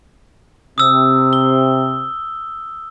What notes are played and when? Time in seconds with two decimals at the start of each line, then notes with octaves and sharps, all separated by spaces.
0.78 C3 C4 D#6 E6
1.33 G7